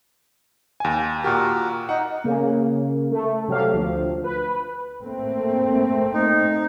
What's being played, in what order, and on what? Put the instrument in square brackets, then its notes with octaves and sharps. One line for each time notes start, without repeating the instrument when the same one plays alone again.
[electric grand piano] D#2 G#5
[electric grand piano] A#2 G4 [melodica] F#4 A#4
[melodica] D#4 [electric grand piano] F#5
[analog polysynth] C#3 A#3
A3
C3 F#3 G4 A4 F5
D2 F3
B4
[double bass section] A3 A#3 C4
[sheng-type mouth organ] D#4